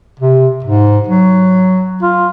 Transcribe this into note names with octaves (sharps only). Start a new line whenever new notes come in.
C3
G#2
F#3
F4